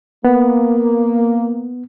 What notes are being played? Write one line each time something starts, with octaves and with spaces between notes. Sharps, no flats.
A#3 B3